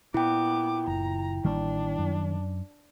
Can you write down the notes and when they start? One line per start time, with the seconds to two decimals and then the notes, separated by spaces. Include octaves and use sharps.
0.14 A#2 B3 E4 G5 D6
0.87 F#1 A#5
1.44 A1 D#3 G3 A#3 D4
1.99 F#2